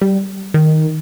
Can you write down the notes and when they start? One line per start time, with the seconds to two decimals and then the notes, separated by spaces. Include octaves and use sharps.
0.01 G3
0.54 D#3